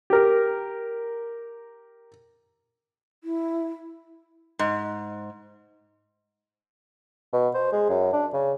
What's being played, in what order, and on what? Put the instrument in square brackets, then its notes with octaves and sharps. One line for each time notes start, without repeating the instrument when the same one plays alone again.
[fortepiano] G4 A#4
[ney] E4
[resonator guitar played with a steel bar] G#2
[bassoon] B2
C5
G#3
F#2
D4
C#3